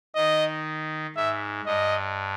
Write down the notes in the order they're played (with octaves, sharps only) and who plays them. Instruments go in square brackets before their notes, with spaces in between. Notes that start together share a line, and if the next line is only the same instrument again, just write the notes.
[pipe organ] D#3 [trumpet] D#5
[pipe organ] G#2 [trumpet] E5
[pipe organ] G2 [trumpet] D#5